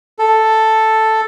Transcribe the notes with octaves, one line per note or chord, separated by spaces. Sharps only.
A4